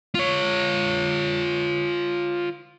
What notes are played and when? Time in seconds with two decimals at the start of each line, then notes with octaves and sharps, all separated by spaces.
0.15 F4 C#5